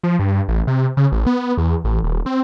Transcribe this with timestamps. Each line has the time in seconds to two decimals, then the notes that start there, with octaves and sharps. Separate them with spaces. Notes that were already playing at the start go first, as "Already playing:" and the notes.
0.03 F3
0.19 G2
0.48 A1
0.67 C3
0.97 C#3
1.12 A1
1.27 B3
1.58 E2
1.84 A1
2.04 D#1
2.26 C4